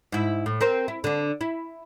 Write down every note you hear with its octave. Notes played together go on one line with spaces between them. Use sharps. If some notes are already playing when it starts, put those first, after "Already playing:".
G#2 E4
A2
C4 A#4 C5
E4
D3 D4
E4